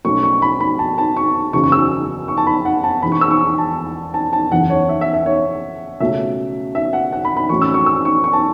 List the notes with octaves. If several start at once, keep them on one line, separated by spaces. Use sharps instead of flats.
B1 B2 A3 C#4 C#6
C#6
B5
B5
A5
A5
C#6
F#1 E2 C#3 F#3 C#6
C#6
E6
C#6
A5
B5
F#5
A5
E1 E2 E3 B5
C#6
E6
C#6
A5
A5
A5
F#1 E2 E3 F#5
C#5
E5
E5
E5
C#5
C#2 B2 A3 C#4 E5
E5
F#5
F#5
B5
B5
A1 A2 F#3 A3 C#4 C#6
E6
C#6
E6
C#6
C#6
A5